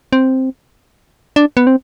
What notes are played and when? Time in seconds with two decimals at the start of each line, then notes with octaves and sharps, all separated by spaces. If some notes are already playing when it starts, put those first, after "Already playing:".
0.13 C4
1.36 D4
1.57 B3
1.67 C4